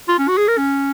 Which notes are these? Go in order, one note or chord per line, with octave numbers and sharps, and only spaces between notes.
F4
C#4
F#4
G#4
A#4
C#4